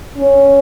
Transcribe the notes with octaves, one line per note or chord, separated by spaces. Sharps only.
C#4